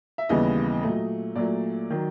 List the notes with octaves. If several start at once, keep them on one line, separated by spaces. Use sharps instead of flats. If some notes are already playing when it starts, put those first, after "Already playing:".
E5
D#2 C#3 E3 G3 B3 D#5
A#2 F#3 A3
A#2 F#3 A3 D5
D#3 F#3